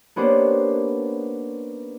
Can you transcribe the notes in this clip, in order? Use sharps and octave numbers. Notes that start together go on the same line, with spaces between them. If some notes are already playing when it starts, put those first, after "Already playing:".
A#3 B3 C#4 D4 G4 C5